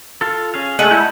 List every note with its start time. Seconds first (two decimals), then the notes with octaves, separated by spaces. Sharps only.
0.21 F4 A4
0.54 C#4 G#4 F5
0.79 G#3 A3 F#5
0.91 E4 F#5 A5 G6